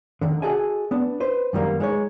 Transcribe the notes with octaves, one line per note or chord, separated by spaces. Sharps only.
D3 D#3
F#4 G#4 A4 D#5 G#5
B3 D4
B4 C5
F#2 D#3 G3 A#3
G#3 D#4 A#4 C#5